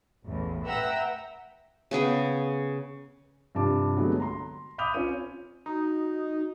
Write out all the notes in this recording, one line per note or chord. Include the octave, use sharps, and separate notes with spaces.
A1 E2 A2
B4 E5 F#5 G5 A#5 E6
C#3 B3 G#4 G5
G2 C3 F3 A5 D6
D3 F#3 G#3 A3 B3
A#5 C6
B5 D6 D#6 G6 F7
C4 C#4 F4 C#5 D#7
D#4 F#4